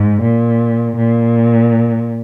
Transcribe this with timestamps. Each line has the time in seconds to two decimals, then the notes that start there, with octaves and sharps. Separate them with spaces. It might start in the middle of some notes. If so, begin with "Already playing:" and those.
Already playing: G#2
0.22 A#2
0.97 A#2